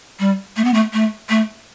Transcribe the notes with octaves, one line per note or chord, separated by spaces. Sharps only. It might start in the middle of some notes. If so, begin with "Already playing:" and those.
G3
A3
B3
A3
A3
A3